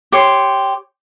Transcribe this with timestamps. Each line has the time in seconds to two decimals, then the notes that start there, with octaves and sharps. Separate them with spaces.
0.12 G4 C#5 C6